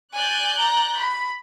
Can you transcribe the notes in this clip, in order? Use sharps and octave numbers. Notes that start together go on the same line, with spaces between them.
D5 G#5 F#6 G6
A#5
B5